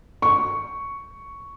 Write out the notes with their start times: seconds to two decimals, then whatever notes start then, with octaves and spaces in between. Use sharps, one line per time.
0.22 C#6